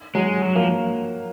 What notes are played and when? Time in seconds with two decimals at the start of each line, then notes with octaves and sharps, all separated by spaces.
0.15 F#3 G#3
0.42 F#3
0.55 F3 A#3